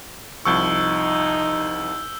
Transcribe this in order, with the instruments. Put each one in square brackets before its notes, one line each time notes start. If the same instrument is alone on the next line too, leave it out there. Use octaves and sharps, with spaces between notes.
[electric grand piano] C2 F3 C#6 [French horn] D#4 [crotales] E6 G6 G7